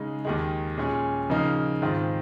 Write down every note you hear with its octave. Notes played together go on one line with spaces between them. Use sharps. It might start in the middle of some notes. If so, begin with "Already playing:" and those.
Already playing: C#3 G#3 D#4
D#2 D#3 G#3
A#2 G#3 C#4 G#4
C#3 F3 A#3 D#4
G#2 D#3 G#3 C4 F4